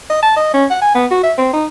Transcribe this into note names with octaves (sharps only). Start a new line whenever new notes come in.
D#5
A5
D#5
C#4
F#5
G#5
B3
F#4
E5
C4
D#4